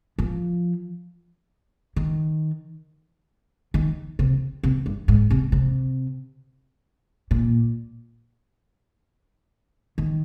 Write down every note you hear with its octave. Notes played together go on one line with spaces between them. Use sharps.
F3
D#3
D#3
C3
C3
G2
G#2
C3
C3
A#2
D#3